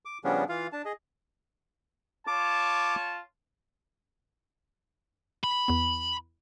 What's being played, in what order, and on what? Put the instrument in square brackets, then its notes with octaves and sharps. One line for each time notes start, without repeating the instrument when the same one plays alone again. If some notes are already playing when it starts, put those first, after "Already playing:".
[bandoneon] D6
C#3 F3 G3 B3 C#4 D4
E3 F4 F5
D4 A5
G#4 D#5
[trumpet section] F4 C#5 A5 [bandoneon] D6
[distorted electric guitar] B5
[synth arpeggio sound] E2 B3